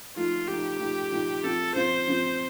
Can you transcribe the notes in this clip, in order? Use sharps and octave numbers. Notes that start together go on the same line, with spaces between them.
F3 A3 D#4 F4
F3 A3 D#4 G4
F3 A3 D#4
F3 A3 D#4
F3 C4 F4 A4
F3 C4 F4 C5
F3 C4 F4